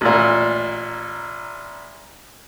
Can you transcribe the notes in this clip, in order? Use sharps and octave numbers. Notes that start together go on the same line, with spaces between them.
A1 A#2